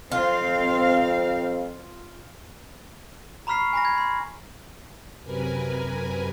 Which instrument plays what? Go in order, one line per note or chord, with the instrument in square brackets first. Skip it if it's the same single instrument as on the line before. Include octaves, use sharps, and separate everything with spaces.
[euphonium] F2 [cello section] C4 F5 [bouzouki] F4
[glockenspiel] A#5 B5 C#6 F6 B6 C7
G#5 B5 A#6
G#6
C6
[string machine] F#2 C3 A#4 B4 G#5